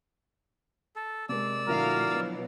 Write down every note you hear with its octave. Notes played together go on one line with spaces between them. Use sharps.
A4
C3 G#3 A#4 D5 E6
A#2 D3 F3 A3 E4 F#4 A#4 F5
B2 F#3